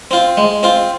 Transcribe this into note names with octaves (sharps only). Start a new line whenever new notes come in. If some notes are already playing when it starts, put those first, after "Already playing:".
C4 F4
G#3
C4 F4